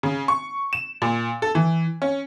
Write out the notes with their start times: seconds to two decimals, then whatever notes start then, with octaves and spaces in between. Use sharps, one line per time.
0.03 C#3
0.28 C#6
0.73 E7
1.02 A#2
1.42 A4
1.55 E3
2.02 C#4